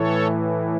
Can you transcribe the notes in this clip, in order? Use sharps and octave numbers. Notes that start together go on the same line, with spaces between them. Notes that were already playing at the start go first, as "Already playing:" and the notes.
Already playing: A2 E3 A4 C#5